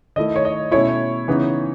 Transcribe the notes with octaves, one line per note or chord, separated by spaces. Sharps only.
D#3 A3 E4 D#5
C#5
D#5
B2 A3 C#4 E4 C#5
C#3 E3 B3 D#4